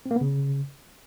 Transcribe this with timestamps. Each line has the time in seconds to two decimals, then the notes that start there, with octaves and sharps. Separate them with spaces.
0.06 C4
0.11 A#3
0.16 B3
0.21 C#3